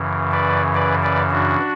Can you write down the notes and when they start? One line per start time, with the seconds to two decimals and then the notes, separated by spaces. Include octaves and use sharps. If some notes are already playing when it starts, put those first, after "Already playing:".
Already playing: F#2 C#3 E3
0.32 B4 D5
0.74 B4 D5
1.03 B4 D5
1.30 D4 F#4